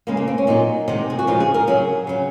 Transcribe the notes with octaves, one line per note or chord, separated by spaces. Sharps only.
C#3 G#3 A#3
A#3
C4
C#4
A#2 F#3 D#4
C3 D#3 G#3
G#4
F#4
C#3 F3 G#3 F4
G#4
A#4
C#3 F#3 G#4
C#3 F#3